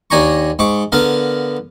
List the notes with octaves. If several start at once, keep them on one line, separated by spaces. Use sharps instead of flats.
D#2 D4 G#5 A#5 C#6
G#2 C#6 D6
D3 B3 A#4 F5